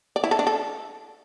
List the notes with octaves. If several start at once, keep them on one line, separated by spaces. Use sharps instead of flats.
D5
E4
A4
D4
A4